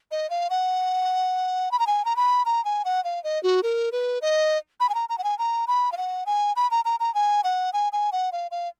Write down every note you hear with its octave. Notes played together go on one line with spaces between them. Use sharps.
D#5
F5
F#5
B5
A#5
G#5
A#5
B5
A#5
G#5
F#5
F5
D#5
F#4
A#4
B4
D#5
B5
G#5
A#5
A#5
F#5
G#5
A#5
B5
F5
F#5
G#5
B5
A#5
A#5
A#5
G#5
F#5
G#5
G#5
F#5
F5
F5